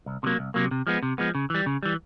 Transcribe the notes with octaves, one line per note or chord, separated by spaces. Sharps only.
C2
C3 D#3 F#3 A#3
C2
C3 D#3 F#3 A#3
C3
F3 G#3 B3
C3
F3 G#3 B3
C#3
E3 G3
C#3
E3 G3